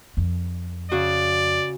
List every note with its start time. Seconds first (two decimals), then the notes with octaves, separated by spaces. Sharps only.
0.17 F2
0.92 C#3 F#4 D5